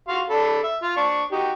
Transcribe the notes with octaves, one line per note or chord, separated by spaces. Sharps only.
F#4 F5 C6
D4 A4 B5
E5
F4
D4 C#6
D#4 F#4 G4